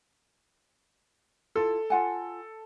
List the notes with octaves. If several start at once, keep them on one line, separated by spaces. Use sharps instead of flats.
E4 F4 A4
F4 F#5 G#5